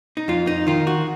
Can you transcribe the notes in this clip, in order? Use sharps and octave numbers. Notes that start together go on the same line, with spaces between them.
D#4
F2 F4
D#4
D#3 F4
F#4